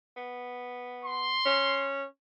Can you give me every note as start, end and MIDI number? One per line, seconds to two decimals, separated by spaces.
0.16 1.33 59
1.04 1.84 84
1.46 2.04 61